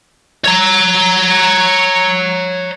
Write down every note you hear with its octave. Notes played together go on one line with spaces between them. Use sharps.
C#5 A#5